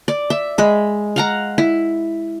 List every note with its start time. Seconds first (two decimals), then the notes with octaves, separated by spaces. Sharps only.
0.08 D5
0.30 E5
0.58 G#3 B5
1.16 F5 F#5 A#5
1.58 E4